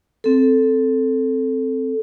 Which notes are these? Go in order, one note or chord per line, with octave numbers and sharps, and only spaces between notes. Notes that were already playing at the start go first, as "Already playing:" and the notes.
C4 A4